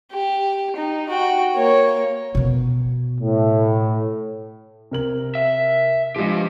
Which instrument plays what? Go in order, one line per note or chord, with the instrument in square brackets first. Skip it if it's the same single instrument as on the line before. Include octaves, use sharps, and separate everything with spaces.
[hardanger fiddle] G4
D#4
F#4 G5
A#3 C#5
[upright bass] B2 B3
[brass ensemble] A2
[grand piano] C3 A#4 F#7
[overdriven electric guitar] E5
[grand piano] F3 G#3 [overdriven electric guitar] D4 G4